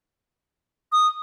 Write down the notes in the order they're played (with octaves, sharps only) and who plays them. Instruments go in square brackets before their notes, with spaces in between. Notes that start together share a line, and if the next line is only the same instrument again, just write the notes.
[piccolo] D#6